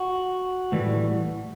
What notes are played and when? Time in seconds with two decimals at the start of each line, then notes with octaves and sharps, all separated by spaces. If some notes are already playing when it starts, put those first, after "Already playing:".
Already playing: F#4
0.72 A2 E3 G3